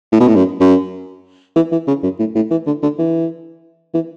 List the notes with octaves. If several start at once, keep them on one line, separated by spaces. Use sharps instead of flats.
A2
B2
A2
F#2
F#2
E3
E3
C#3
F#2
A2
A2
E3
D3
D3
E3
E3